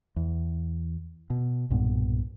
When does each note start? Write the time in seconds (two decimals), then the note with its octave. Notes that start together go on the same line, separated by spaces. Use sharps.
0.16 E2
1.30 B2
1.70 B1 G2 A#2 B3